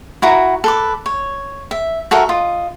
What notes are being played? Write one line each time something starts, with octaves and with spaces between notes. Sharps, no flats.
E4 F#4 A#5
A4 B4 D6
C#5
E5
F#4 A4 A#4 E5
F4 D#5